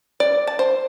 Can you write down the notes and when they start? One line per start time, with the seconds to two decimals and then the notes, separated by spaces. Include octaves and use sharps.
0.20 D5
0.47 A5
0.59 C5